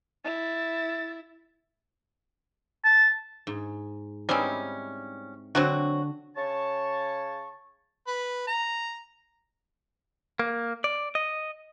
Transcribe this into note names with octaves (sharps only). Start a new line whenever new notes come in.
E4 A6
A5
G#2
G3 C4 C#4 D#4 E4
D3 F#3 C4 F#4
C#3 C#5 A5 C#6
B4
A#5
A#3
D5
D#5